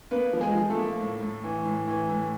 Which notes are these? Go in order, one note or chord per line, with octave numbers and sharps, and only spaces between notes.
A#3 B3 B4
F3
G#3 G#4
F3
A3 A4
A#3
A2
A2
E3
A2
E3
A2